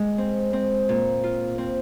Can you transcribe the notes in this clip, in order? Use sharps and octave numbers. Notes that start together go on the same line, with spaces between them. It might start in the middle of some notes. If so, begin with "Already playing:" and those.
Already playing: G#3
C4
C4
A#2
F4
C4